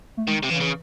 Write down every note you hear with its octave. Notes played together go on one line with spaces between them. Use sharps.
A3
D#3 G#3
C3
C#3 E3
C#3